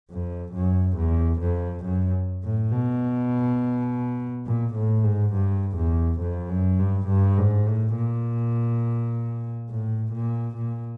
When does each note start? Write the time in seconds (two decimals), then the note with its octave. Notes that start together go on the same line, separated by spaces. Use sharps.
0.10 F2
0.54 F#2
0.97 E2
1.41 F2
1.85 F#2
2.43 A2
2.72 B2
4.46 A#2
4.75 A2
5.04 G#2
5.34 G2
5.77 E2
6.21 F2
6.50 F#2
6.79 G2
7.08 G2
7.37 G#2
7.66 A2
7.95 A#2
9.70 A2
10.13 A#2
10.57 A#2